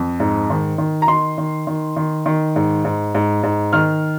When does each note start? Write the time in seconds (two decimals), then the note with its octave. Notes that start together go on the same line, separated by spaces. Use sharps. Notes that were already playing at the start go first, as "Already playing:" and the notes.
Already playing: F2
0.20 G#2
0.50 D#3
0.78 D#3
1.02 A#5
1.08 D#3 C6
1.38 D#3
1.67 D#3
1.97 D#3
2.26 D#3
2.56 G#2
2.85 G#2
3.15 G#2
3.43 G#2
3.73 D#3 F6